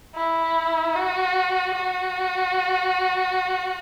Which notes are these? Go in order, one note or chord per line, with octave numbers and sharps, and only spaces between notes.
E4
F#4
F#4